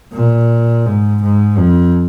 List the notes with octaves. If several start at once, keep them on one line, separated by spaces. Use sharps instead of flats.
A#2
G#2
G#2
F2